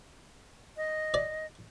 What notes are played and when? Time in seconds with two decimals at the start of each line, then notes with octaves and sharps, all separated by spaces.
0.77 D#5
1.14 D5